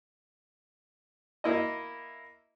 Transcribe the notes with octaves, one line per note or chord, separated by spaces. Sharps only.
A#3 E4 D#5